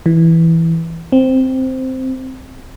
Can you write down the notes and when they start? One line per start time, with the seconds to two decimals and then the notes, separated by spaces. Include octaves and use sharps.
0.06 E3
1.12 C4